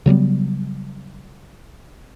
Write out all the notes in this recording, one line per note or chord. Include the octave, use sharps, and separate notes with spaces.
C#3 F#3 G3 B3